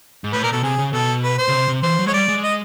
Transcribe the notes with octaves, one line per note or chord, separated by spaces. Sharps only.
G#2
A2 B4
A#2 A#4
B2 A4
C3 G#4
C#3
B2 A4
B4
C5
C#3
C3
C3
E3 C5
F#3
G#3 C#5
G3 D5
G#3
D#5